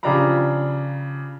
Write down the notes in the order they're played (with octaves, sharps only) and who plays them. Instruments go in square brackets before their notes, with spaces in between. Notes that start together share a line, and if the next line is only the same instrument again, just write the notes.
[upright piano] C#3 F3 D4 G4 A#5 B5